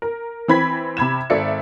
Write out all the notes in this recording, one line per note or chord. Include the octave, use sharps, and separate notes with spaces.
A#4
E3 C4 B5 G#6 B6
C3 B5 G#6 E7
G#1 A4 D5 E5 C#7